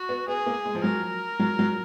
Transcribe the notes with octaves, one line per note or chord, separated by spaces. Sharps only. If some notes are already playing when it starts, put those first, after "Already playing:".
Already playing: F#4
B3
B3 G#4
A#3
G#3
F3
F#3 A#4
F#3
F#3